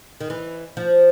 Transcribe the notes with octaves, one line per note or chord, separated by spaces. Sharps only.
D#3
E3
F3